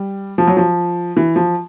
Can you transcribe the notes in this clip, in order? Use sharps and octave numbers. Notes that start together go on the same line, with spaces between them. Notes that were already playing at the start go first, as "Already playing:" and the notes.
Already playing: G3
F3
F#3
F3
E3
F3